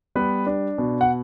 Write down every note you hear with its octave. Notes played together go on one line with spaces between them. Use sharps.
G3 B3 B4
D4
B2
F#5